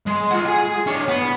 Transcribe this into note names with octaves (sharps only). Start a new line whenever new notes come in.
G#3
F4 F#5
G#4 G#5
D4 C#5
B3